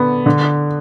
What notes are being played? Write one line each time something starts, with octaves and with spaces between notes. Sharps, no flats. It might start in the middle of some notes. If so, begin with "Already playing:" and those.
Already playing: D3 B3
D3